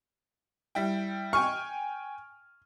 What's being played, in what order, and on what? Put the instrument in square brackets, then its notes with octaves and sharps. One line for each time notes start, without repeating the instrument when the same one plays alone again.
[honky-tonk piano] G3 E4 G5
[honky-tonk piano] G5 G#5 F6 [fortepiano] C#6